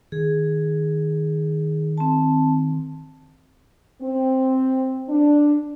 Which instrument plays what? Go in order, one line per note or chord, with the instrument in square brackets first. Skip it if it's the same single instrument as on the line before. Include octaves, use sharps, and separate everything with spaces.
[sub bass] D#3 [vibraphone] G#4
[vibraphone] C4 A5
[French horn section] C4
D4